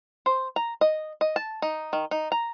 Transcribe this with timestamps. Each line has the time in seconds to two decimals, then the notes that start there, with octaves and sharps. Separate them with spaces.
0.26 C5
0.56 A#5
0.81 D#5
1.21 D#5
1.36 A5
1.62 D#4
1.93 D#3
2.11 D#4
2.32 A#5